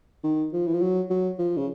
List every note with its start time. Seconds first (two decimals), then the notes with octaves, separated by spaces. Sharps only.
0.24 D#3
0.53 F3
0.67 E3
0.74 F3
0.82 F#3
1.10 F#3
1.39 F3
1.57 C#3